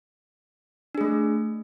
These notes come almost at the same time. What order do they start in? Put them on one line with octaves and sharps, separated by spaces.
D4 G#4 A3